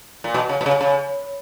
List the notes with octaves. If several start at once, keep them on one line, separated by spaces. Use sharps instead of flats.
A#2
B2
C#3
B2
C#3
C#3